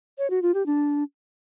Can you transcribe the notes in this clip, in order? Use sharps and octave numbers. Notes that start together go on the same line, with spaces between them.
C#5
F#4
F4
G4
D4